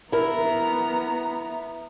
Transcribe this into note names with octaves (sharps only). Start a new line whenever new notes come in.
B3 E4 A#4 A#5